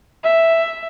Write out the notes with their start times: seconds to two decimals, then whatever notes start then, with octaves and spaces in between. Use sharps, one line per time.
0.24 E5